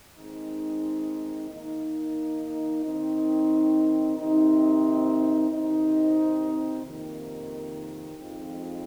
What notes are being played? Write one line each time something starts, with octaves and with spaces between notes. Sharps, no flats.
D#3 G#3 C4 D#4
D#3 A#3 D#4
D#3 C4 D#4
C3 D#3 C4 D#4
C3 D#3 C4 D#4
F2 C3 D#3 A#3
F2 F3 G#3 C4 D#4